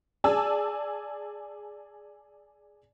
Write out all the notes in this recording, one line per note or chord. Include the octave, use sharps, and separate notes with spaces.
G#4 D5 G#5 A5 E6